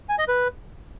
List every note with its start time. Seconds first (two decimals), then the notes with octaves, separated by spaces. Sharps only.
0.09 G#5
0.19 D#5
0.28 B4